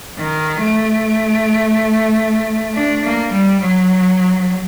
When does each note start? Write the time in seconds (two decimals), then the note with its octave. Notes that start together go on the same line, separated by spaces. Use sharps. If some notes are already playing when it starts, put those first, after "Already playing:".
0.18 D#3
0.61 A3
2.75 D4
3.03 A#3
3.31 G3
3.60 F#3